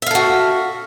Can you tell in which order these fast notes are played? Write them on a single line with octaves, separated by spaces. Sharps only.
E5 F5 A4 F#4